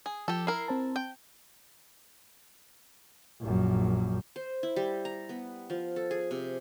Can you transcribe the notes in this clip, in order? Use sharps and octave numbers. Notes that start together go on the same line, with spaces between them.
G#4
F3 G4 A4
E4 A#4 C7
C4 C5 A5
G5
A#1 F#2
C5
E4
G3
A#5
B3
F3
A4
G#4
C3